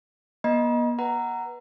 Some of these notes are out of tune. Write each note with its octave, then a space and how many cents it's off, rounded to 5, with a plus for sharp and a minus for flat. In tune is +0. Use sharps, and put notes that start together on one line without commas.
B3 -45 D#5 +0 A#5 +45
B4 -15 F#5 +10 A#5 -10